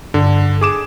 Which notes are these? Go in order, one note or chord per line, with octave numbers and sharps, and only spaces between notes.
G2 D3
G#4 D6 E7